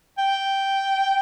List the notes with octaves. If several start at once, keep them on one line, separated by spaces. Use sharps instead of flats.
G5